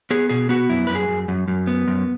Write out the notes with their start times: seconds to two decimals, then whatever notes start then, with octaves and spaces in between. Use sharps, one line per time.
0.11 B3 G#4
0.29 B2 G#4
0.49 B3 F#4
0.69 F#2 E4
0.87 F#2 B4
0.95 G#4
1.08 F#2
1.28 F#2
1.48 F#2
1.67 B3
1.87 F#2